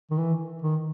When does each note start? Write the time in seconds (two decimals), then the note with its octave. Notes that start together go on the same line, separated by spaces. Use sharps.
0.11 D#3
0.18 E3
0.62 D#3